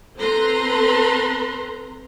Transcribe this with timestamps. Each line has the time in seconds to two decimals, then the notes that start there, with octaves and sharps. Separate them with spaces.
0.17 C4 A4 B4 A#5 C6